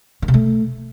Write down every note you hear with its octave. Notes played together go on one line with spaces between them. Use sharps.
D#3
C3
A3